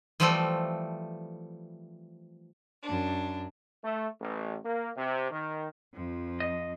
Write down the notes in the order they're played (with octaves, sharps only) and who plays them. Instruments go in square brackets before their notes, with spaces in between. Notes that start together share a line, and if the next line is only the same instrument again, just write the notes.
[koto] E3 F3 G3 A3 C4 A4
[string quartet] F#2 D4
[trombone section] A3
A1
A#3
C3
D#3
[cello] F2 F3
[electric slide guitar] D#5